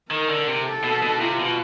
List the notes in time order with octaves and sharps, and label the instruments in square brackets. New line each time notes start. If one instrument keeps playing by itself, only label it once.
[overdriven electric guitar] D#3 [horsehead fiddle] A#4
[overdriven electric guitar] D3
C3
[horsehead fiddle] A4
[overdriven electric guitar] B2
B2
[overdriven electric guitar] C3 [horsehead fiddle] F4
[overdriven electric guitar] B2